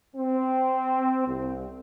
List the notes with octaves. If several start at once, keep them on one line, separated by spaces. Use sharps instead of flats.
C4
C2